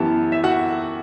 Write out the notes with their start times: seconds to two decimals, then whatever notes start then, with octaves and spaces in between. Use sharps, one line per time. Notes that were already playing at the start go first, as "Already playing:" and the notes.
Already playing: F#2 E3 B3 G4 A5
0.32 E5
0.44 F#4 F#5